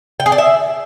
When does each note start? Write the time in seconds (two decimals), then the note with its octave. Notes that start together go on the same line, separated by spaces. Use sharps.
0.20 G5
0.26 G#4
0.32 D5
0.38 E5